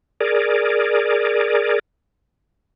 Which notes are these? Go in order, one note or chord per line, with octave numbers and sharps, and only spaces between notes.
G#4 A#4 D5